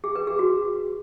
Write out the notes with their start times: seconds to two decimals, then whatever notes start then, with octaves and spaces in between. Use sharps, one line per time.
0.04 G#4
0.15 B4
0.27 G#4
0.39 F#4